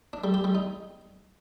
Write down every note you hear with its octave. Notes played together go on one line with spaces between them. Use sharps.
D4
G3
G4
G3
D#4